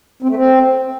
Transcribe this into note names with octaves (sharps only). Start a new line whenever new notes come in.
C4
A3
C4